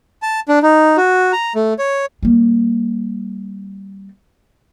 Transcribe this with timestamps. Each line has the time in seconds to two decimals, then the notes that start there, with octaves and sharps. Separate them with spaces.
0.22 A5
0.49 D4
0.63 D#4
0.97 F#4
1.33 A#5
1.55 A3
1.79 C#5
2.23 G3 A#3